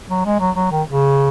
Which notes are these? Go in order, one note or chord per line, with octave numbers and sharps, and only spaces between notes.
F#3
G#3
F#3
F#3
D#3
C#3